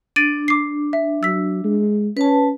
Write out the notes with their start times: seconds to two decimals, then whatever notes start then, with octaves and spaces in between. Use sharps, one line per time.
0.16 D4 A6 D7 D#7
0.48 D6 C7
0.93 E5
1.23 F#3 E6 B6
1.64 G#3
2.17 C#4 B4 A5